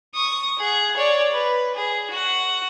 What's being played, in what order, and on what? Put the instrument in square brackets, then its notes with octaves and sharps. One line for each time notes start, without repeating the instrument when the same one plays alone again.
[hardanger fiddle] C#6 D#6
G#4 F#5
C#5 D5
B4
G#4
F#4 F#5